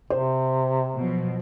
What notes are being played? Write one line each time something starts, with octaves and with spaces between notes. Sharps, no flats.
C3 C5
B2 F3 F#3